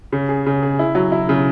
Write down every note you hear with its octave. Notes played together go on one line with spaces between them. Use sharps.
C#3
G#4
C#3
G#4
E4
F#3
E4
C#3